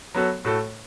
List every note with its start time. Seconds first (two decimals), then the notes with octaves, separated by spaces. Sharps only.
0.14 F#3 B3 F#4 A4
0.45 A2 A3 F#4 A4